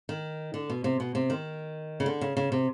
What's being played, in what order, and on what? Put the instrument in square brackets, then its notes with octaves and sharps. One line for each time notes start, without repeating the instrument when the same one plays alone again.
[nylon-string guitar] D#3
D3
B2
C3
B2
C3
D#3
C#3
D3
C#3
C#3
C3